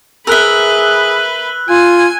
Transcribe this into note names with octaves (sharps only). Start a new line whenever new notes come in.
G#4 A#4 B4 E5 E6 F#6 G7
F4 G#5